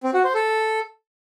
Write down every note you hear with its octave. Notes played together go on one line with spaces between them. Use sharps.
C4
F#4
C5
A4